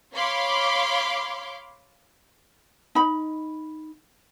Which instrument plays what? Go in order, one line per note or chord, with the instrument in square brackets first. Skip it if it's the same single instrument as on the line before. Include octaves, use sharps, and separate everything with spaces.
[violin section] C#5 F5 B5 C6 D6
[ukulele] D#4 B5